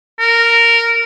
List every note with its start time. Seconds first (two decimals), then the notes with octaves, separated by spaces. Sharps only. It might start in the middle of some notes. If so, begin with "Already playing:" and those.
0.19 A#4